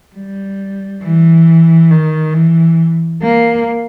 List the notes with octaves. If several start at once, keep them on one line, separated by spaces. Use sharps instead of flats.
G3
E3
D#3
E3
A#3